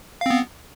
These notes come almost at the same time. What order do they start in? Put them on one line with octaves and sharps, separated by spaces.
F5 C4 B3